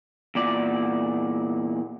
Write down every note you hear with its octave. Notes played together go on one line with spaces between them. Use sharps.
E2 A#2 D5